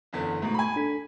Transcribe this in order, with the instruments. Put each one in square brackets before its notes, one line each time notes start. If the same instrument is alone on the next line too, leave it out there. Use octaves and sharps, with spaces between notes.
[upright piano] F#1 E2 D3
[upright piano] G#2 B2 [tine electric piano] A3 A#5
[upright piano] G#5 B5
[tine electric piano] D4 A4 B6